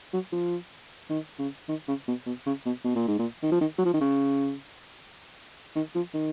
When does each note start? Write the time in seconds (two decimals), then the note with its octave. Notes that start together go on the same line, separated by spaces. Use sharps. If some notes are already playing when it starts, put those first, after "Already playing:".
0.13 F#3
0.33 F3
1.10 D#3
1.39 C#3
1.69 D#3
1.88 C#3
2.08 B2
2.26 B2
2.46 C#3
2.66 B2
2.84 B2
2.96 A#2
3.08 G#2
3.19 A#2
3.42 D#3
3.52 F3
3.61 D#3
3.78 F#3
3.85 F3
3.94 D#3
4.01 C#3
5.76 D#3
5.95 F3
6.14 D#3